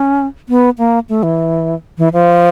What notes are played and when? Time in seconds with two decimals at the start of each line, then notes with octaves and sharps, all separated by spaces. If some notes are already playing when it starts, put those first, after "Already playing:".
Already playing: C#4
0.49 B3
0.78 A#3
1.09 A3
1.23 E3
1.98 E3
2.13 F3